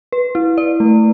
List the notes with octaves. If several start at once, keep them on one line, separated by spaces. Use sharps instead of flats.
B4
E4
D5
A3